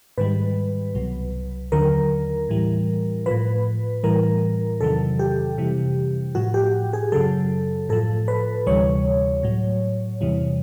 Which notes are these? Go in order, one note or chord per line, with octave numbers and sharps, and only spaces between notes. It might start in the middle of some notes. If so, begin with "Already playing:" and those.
G#2 D#3 G3 B4
C2 B2 F#3
D#2 D3 F#3 A#4
A2 E3 G3
A2 F3 B4
A2 E3 G3 A#4
E2 C3 D#3 F#3 A4
G4
F2 C3 E3 G3
A2 F3 F#4
G4
G#4
F#2 C#3 F#3 A4
A2 F3 A4
B4
D2 C3 E3 G3 C#5
A2 F#3
E2 C3 E3 G3